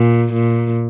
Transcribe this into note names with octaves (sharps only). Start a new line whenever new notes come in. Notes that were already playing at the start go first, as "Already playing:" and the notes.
Already playing: A#2
A#2